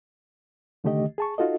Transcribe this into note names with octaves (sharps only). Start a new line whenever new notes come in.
C2 D3 D#3 A3 G4 D#5
G#4 A5 C#6
D#4 F4 F#4 A4 D#5